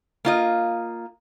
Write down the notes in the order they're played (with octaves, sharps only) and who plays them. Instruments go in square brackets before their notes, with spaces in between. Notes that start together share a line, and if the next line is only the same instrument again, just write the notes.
[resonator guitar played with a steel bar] A#3 F4 D#5